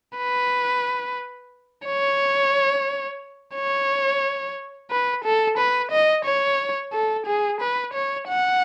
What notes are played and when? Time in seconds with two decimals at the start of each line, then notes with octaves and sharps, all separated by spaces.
0.18 B4
1.86 C#5
3.55 C#5
4.91 B4
5.24 A4
5.58 B4
5.91 D#5
6.25 C#5
6.93 A4
7.27 G#4
7.61 B4
7.94 C#5
8.29 F#5